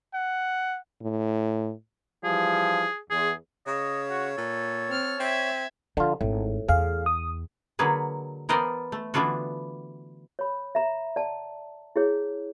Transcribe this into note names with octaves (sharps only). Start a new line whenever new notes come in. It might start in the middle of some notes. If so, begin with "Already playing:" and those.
F#5
A2
E3 F3 G3 G#4
E2 G#4
C#3 C#5 D#5
F#4
A#2 A4
C4 F6
C4 E5 G#6
D3 F3 F4
G#1 A2
E2 G#4 F5
D#6
D3 F#3 A#3 G#4 B4
E3 B3 A#4 C5 D5 D#5
A3
D3 E3 B3 D4 F4 F#4
C#5 B5
E5 A#5
D5 F#5 A5
E4 G#4 C#5